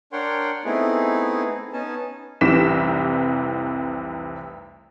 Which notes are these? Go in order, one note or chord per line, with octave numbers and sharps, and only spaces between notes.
D4 A#4 C#5 F#5 G5 C6
A3 B3 C4 D#4 E4 G#4
B3 C#4 D#4 G#5 A5
F1 C2 C3 E3 B6 E7